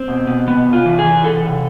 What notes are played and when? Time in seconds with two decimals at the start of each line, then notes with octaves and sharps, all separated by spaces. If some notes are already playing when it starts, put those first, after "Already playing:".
Already playing: C4
0.08 B2
0.27 B2
0.47 C3 B3
0.66 C3
0.73 F4
0.85 E3
0.99 G#4
1.04 E3
1.24 C3 A4
1.43 C3